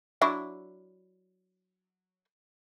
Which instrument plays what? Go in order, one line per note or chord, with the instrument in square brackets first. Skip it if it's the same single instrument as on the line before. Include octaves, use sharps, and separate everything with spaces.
[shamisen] F#3 D4 E4